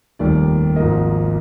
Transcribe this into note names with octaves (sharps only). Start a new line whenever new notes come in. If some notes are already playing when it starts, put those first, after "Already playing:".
F1 D#2 D#3 G3 D5
G#1 G#2 F3 A#3 D#5